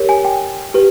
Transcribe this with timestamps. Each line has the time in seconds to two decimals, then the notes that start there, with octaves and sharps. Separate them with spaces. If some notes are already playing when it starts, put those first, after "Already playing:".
Already playing: G4 A#4 C#5
0.09 G#5
0.25 G5
0.74 G4 B4